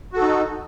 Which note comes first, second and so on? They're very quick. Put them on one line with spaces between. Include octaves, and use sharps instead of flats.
F#4 A4 D#4